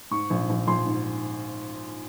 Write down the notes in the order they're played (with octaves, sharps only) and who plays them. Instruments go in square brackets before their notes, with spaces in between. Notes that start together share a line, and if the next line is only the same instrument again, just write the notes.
[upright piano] G#2 C#6
A#1
A#1
A#1 C6
G#2